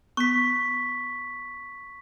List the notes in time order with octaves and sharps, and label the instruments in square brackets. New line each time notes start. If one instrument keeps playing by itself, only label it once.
[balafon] B3 [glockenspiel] C#6 B6